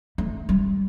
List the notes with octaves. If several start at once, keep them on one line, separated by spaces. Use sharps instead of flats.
A3
G3